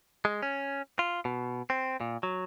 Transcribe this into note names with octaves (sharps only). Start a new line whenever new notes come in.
G#3
C#4
F4
B2
C4
A#2
F#3